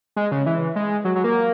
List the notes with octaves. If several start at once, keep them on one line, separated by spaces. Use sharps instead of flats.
G#3
C#3
E3
G#3
F#3
F#3
A#3